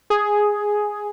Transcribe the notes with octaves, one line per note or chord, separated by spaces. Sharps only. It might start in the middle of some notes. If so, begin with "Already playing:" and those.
G#4